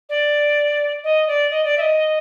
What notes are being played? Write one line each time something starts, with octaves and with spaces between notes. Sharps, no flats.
D5
D#5
D5
D#5
D5
E5
D#5